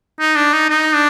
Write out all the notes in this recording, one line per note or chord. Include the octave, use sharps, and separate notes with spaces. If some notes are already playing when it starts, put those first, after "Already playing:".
D#4
D4
D#4
D#4
D4